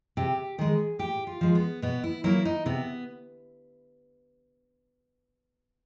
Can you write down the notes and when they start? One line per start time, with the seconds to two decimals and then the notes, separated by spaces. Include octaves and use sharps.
0.17 C3 G4
0.58 D#3 G#3 G#4
0.99 A2 G4
1.27 F4
1.41 F3 G#3
1.55 B3
1.82 B2 B3
2.04 E4
2.24 F#3 A#3 E4
2.45 D#4
2.66 C3 B3